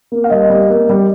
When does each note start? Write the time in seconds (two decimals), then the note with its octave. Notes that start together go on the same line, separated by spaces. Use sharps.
0.12 A#3
0.24 F5
0.30 G3 D#5
0.50 G3
0.70 A#3
0.89 G3